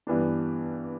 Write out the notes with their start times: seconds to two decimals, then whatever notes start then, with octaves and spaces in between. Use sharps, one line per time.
0.07 G2 E3 B3 D4